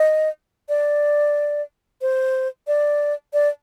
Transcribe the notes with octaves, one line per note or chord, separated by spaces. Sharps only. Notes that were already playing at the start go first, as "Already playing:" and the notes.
Already playing: D#5
D5
C5
D5
D5